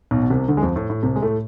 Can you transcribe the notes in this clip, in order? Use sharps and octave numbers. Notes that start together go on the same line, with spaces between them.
B1 B2
B2
C2 C3
D2 D3
G#3
F2 F3
A2
A2
C2 C3
G#3
A2 A3